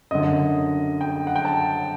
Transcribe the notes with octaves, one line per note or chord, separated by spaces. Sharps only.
F#2 D3 D#5
G5
F#5
G5
A5